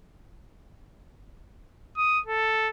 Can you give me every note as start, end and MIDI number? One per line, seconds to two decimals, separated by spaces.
1.97 2.20 87
2.26 2.68 69